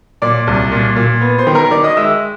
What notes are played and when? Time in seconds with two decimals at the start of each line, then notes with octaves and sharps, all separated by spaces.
0.22 A#2 D5 D6
0.47 C2
0.72 A#2
0.96 A#2
1.21 B3
1.38 C5 C6
1.47 D#3
1.55 A#4 A#5
1.71 D#3 D5 D6
1.84 D#5 D#6
1.97 G#3 E5 E6